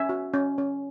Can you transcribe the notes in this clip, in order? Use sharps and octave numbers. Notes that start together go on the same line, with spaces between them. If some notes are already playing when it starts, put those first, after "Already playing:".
Already playing: C#4 E5 G#5
F#4
C#4
C#4